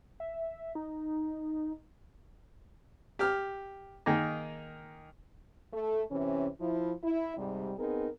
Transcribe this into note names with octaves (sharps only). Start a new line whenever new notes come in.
E5
D#4
G4 F6
D#3 A#3 D#4 G#4 D#5
A3
C3 E3 C#4
F3 E4
E4
G#2 C3 G3
B3 C4 D#4 G#4 A#4